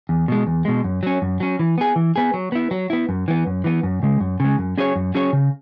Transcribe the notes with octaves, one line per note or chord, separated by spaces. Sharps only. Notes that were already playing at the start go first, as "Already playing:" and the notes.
E2
B2 G#3
E2
B2 G#3
F#2
F#3 C#4
F#2
F#3 C#4
E3
B3 G#4
E3
B3 G#4
F#3
B3 E4
F#3
B3 E4
F#2
E3 B3
F#2
E3 B3
F#2
C#3 G#3
F#2
C#3 G#3
F#2
F#3 C#4 G#4 C#5
F#2
F#3 C#4 G#4 C#5
C#3